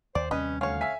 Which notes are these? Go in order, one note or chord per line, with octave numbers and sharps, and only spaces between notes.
D#2 C5 D5
D#2 C3 G3 C#4 B4 D#5
D2 C#4 C#5 F5
E5 G#5 B6